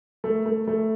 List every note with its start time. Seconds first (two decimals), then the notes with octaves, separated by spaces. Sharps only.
0.24 A3
0.46 A3
0.67 A3